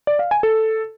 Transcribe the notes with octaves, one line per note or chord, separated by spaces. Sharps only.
D5
F5
G#5
A4